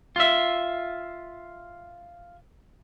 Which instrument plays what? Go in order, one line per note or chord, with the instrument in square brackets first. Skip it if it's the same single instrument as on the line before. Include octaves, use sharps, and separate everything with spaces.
[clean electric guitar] F4 E5